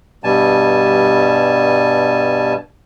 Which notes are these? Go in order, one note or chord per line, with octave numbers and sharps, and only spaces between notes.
G2 B2 G3 G#5 A5